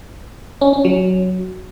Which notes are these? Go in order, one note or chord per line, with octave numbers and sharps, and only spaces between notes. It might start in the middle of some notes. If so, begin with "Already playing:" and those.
C#4
C#4
F#3